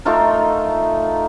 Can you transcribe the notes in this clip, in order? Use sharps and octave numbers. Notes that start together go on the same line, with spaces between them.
A3 D#4 F4 A#4